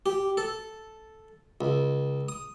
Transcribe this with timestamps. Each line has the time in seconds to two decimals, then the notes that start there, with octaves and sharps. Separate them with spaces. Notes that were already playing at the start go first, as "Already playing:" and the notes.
0.06 G4
0.37 A4
1.61 C#2
2.29 D#6